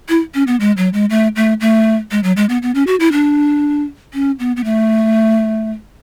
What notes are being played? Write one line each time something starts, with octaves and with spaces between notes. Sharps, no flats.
E4
C#4
B3
G#3
F#3
G#3
A3
A3
A3
G#3
F#3
G#3
B3
B3
C#4
F#4
E4
D4
C#4
B3
B3
A3